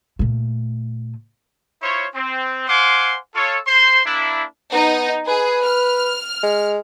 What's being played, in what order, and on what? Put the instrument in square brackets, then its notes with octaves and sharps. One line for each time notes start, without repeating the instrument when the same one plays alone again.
[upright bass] A#2 A3
[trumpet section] E4 F4 C5 C#5
C4
C5 F5 F#5 G#5 C6 D6
F4 A4 C#5
C5 C6
A#3 D4 E4
[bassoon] B3 [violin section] D#4
[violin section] G#4 [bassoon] B4
[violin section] F6
[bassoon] G#3